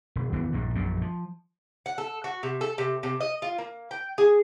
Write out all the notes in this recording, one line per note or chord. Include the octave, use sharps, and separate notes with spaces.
E1
G#1 E2 E3 B3
A#1 E2 G2
A#1 F#2 A#2
F3
F#5
A4
F#4
C3
A4
C3
C3
D#5
F4
A#3
G5
G#4